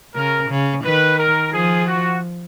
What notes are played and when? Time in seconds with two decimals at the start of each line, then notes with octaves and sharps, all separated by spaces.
0.15 C#3 A#4
0.50 C#3
0.84 D#3 B4
1.18 A#4
1.52 F3 G#4
1.87 F#4